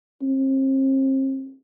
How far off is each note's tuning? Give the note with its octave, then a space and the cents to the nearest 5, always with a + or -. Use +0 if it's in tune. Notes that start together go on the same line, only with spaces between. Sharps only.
C4 +40